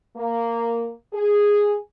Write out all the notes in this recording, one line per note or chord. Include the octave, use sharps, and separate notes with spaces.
A#3
G#4